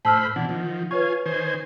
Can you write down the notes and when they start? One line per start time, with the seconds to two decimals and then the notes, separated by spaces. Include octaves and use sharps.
0.05 A2 C5 A5 B5 E6 F6
0.36 B2 E3 D4 F#5
0.49 D#3 F3
0.91 F4 B4 C#5 G#5 C#6
1.26 D#3 C5 G#5